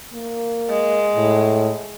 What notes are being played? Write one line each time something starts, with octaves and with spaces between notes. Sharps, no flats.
A#3
G#3
A2